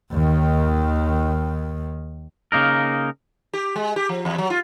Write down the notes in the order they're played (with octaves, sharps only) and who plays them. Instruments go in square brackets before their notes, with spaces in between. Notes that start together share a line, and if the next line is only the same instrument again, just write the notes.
[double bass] D#2 D#3
[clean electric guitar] C#3 A#3 D#4 A#4
[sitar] G4
G#3
G4
F3
E2
F#3
F4